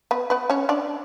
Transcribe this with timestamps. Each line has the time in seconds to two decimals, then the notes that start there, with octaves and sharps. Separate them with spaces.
0.11 B3 B4
0.30 B3 B4
0.50 C#4 C#5
0.69 D4 D5